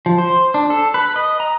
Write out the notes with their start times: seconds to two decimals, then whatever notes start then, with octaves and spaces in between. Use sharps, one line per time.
0.06 F3
0.18 C5
0.54 D4
0.70 A4
0.94 B4
1.16 D#5
1.40 A#5